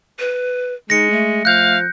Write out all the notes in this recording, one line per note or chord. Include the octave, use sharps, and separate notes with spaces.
B4
G#3 D#4 A#6 C#7
A3
F3 F5 F#6 G6